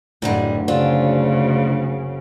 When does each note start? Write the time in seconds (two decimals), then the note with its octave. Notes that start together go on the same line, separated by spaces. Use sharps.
0.22 F#1 D2 A2 G3 G#3 F#5 A#5
0.68 C#3 C4 D4 F4